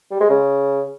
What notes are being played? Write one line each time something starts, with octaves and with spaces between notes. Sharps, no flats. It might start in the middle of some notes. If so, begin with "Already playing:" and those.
G3
G#3
C#3